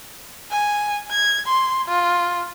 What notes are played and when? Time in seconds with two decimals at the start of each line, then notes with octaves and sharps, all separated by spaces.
0.51 G#5
1.11 G#6
1.47 C6
1.88 F4